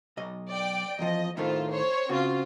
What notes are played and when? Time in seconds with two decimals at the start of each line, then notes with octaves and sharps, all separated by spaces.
0.17 B1 D#5
0.50 D5 G5 D7
0.99 E2 F3 D#5
1.37 A2 D#3 A3 F4 C5
1.69 C5 C#5
2.09 C#3 C4 F4 F#4